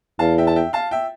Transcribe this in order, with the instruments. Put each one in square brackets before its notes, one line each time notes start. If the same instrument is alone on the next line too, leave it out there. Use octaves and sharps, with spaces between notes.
[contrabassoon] E2 [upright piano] F5 A5
[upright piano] E5 G5
A5
E5 G5
F5 A5
E5 G5